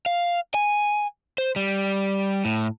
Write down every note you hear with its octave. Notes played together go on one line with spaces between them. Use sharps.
F5
G#5
C5
G3
A2